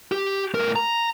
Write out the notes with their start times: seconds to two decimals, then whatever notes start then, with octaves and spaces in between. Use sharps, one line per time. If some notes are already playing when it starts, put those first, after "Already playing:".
0.12 G4
0.54 A2 A#4
0.76 A#5